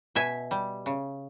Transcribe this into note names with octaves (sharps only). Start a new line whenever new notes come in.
B2 E5 G#5
G3
C#3